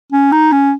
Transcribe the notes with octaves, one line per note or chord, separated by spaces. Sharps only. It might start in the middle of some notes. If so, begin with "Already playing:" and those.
C#4
D#4
C#4